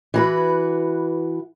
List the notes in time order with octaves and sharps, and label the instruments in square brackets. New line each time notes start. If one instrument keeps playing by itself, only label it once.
[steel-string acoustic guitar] E3 F#4 B4